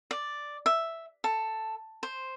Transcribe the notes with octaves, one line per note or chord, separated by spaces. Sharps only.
D5
E5
A4
C5